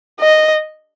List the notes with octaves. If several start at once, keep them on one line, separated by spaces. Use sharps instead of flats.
D#5